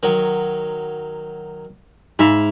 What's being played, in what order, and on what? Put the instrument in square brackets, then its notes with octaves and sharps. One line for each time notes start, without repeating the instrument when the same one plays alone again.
[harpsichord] D#3 F#3
[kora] G#2 E5 [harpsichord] E4 F5